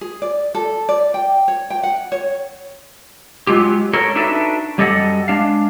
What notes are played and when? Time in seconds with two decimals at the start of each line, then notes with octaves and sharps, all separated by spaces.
0.01 G#4
0.22 D5
0.55 A4
0.89 D5
1.14 G5
1.48 C#5
1.70 G5
1.83 F#5
2.12 C#5
3.47 F#3 G#3 F4 G4
3.93 A4 A#4 C#5
4.15 D4 D#4 F#4 A4 B4 E5
4.78 F#2 G3 G4 A4 D#5 F#5
5.28 G#3 D4 F5